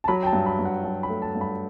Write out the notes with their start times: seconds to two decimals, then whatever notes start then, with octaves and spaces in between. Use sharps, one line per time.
0.04 A5
0.08 F#3 B5
0.23 G5
0.27 A5
0.33 G2
0.46 B5
0.59 G2
0.65 F#5
0.84 F#3 A5
1.03 B5
1.09 A3
1.22 A5
1.35 G2
1.41 B5